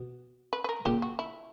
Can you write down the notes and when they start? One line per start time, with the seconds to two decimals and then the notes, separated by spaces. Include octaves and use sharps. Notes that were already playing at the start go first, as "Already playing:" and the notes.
Already playing: B2
0.53 B4
0.64 B4
0.69 A#4
0.86 A#2 C#3 G4
1.02 F#4
1.19 E4